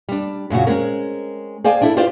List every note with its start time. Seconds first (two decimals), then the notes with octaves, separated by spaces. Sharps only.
0.09 G3 D4
0.50 F#2 A#2 C#3 F#4
0.67 G#3 C4 C#4 A#4
1.64 G#4 C5 D5 F5 G5 G#5
1.82 D4 E4 A4
1.97 F4 G4 B4 C5 D5 F5